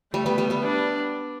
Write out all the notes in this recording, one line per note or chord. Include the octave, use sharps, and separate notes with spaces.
G3 A3
G3 B3
G3 B3
G3 B3
D4